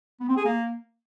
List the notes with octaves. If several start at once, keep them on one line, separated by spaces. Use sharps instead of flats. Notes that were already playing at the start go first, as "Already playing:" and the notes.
B3
C4
G#4
A#3